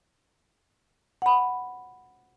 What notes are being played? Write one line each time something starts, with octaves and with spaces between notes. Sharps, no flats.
F#5 B5